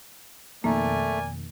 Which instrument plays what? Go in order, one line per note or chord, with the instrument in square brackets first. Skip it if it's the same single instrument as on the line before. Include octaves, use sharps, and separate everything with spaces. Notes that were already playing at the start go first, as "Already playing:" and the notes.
[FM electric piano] F2 B2 D#3 [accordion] A3 [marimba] A#3 [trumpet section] A#4 D5 G#5